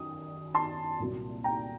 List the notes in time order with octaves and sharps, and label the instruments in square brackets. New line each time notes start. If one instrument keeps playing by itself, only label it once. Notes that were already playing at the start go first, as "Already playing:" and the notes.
Already playing: [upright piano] F#2 D#3 D#6
A5 C6
C2 A#2 F#3 A#3
G5 A#5